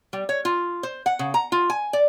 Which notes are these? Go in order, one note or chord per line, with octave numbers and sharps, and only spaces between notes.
G3
C#5
F4
C5
F#5
C#3
A#5
F4
G#5
D5